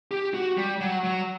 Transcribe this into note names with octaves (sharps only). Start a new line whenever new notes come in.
G4
F#4
G3
F#3
F#3